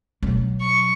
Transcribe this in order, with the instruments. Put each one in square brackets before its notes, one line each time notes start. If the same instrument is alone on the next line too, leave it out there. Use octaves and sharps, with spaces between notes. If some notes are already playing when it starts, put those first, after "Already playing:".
[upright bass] B2 F#3
[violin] C#6